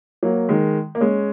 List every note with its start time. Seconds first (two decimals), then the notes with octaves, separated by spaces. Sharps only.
0.23 F#3 A#3
0.49 D#3 G#3
0.95 A#3
1.00 G#3 C#4